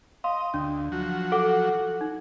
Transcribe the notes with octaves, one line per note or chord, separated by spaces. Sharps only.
D#5 F5 C6
D2 D4
F3 F#3 F#4
A4 F#5 D6
D#4